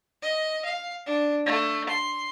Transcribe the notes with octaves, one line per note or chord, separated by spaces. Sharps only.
D#5
F5
D4
A3
C6